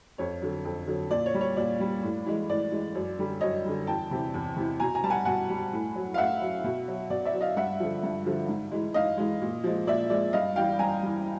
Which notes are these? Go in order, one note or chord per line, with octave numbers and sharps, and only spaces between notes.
F2 C#5
D3 F#3
F2
D3 F#3
A#2 D5
C#5
G3
C#5
A#2 D5
G3
A2
E3 G#3
A2 D5
E3 G#3
F#2
D3 G3
F#2 C#5 D#5
D3 G3
E2 G5 A5
C3 E3
E2
C3 E3
B2 G#5 A#5
G#5 A#5
G3 A5
F#5 G#5
B2 F#5 G#5
G3
A2
F#3
F5
A2 E5 F#5
F#3
B2
F#3
B2 D5
D5 E5
F#3
D#5 F5
G2 E5 F#5
D3 F3
G2
D3 F3
G#2
E3 G#3
G#2 D#5 F5
E3 G#3
A#2
F3 G#3
A#2 D5 E5
F3 G#3 D5
G2 D#5 F5
E3 G3 F5 G5
G2 G#5 A#5
E3 G3